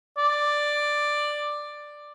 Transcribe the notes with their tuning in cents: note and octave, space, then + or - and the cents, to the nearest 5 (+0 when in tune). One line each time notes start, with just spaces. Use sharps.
D5 +5